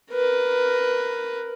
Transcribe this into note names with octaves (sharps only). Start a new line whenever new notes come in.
A#4 B4